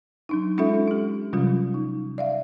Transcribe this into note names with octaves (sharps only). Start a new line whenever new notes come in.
F#3 D4 D#4
G#3 C#4 D#4 F4 A4 E5
D4 G4
C3 E3 F#3 G3 C#4 F4
D#4
D5 E5 F5